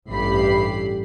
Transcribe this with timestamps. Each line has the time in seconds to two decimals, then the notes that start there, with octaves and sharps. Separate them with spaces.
0.10 A1 G2 G4 B5 C7